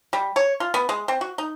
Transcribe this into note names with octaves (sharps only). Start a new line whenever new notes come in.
G3
C#5
F4
B3
G#3
C4
F#4
D#4